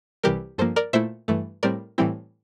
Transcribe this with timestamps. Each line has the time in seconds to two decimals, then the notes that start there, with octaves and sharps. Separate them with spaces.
0.23 C2 C3 E3 G3 G4 A#4
0.58 G2 F3 A#3 A4 C5
0.76 A#4 D5
0.93 A#2 A3 E4 C5 E5
1.28 G2 E3 A3
1.63 A2 G3 C4 A#4 D5
1.98 A2 E3 G3 C4 E4